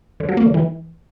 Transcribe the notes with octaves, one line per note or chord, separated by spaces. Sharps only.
D3
F#3
A#3
D3
E3